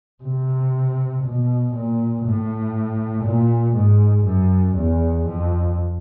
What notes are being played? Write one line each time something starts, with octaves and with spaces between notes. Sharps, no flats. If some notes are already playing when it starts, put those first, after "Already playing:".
C3
B2
A#2
A2
A#2
G#2
F#2
E2
F2